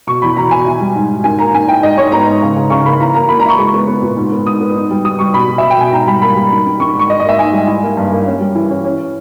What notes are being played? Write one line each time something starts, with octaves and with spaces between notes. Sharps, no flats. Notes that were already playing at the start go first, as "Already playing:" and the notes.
B2 C#6
E2 B5
B2 A#5
B2 G#5
E4
G3
G#2
G#2
D#3 G#5
A#3 A#5
D#3 G#5
E4 G5
G#2 D#5
G#2 C#5
B3 A#5
G#2
C#3
C#3
C#3 C#6
A#3 B5
E3 A#5
A#3 A#5
A#3 B5
A#5
E4 C#6
G#3 C#6
B3
B3
A#2
G#2
B3
G#2 D#6
B3
D#4
G3
G3 D#6
G3 C#6
B2 B5
B2
E5
B2
G5
B2 G#5
G#2 A#5
G3 B5
A#3 B5
G3
D#3
D#3
D#3 C#6
G#2 C#6
G#2 D#5
D#5
A#3 E5
G#2 G#5
G3
E4
A#3
G2
A#3
C#4
G3
E3
C#4
C#4